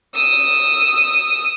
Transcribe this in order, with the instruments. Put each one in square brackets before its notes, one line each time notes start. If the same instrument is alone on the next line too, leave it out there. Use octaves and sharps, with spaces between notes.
[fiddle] D#6 E6